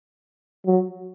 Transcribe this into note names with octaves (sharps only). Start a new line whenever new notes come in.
F#3